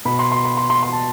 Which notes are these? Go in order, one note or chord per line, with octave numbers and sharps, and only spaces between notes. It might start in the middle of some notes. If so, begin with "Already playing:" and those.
B2 B5
C6
C6
B5
C6
C6
C6
A5